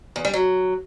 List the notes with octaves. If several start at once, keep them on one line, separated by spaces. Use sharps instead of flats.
E2
G3
F#3